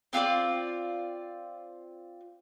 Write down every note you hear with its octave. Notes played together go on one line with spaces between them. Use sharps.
C4 F4 A4 D5